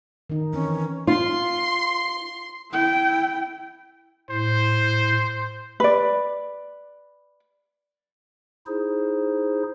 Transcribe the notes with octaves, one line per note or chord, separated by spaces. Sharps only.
D#3 D#4
E3 C4 C#4
F4 C6
E4 G5
A2 C5
B4 D5
D#4 E4 G#4 C5